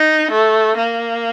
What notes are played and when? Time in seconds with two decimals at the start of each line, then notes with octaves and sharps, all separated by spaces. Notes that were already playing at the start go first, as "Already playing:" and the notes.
Already playing: D#4
0.31 A3
0.77 A#3